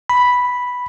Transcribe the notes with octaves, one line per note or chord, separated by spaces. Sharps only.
B5